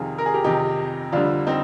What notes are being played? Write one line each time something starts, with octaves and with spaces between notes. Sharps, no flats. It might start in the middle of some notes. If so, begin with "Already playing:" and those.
Already playing: F2 C3 D#3 F4 G#4
A#4
G#4
G4 A#4
F2 C3 D#3 D#4 G4
F2 D3 G3 D4 F4
C4 D#4